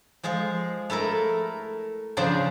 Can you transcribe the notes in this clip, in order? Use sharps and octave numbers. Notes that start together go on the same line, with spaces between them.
F3 G#3 G#4 F5
A3 E4 A4 A#4
C#3 F3 C#4 D4 C5